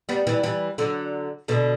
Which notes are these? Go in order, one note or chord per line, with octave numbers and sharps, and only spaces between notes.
G3 B3
E3 G3
E3 G3
D3 F#3
B2 D3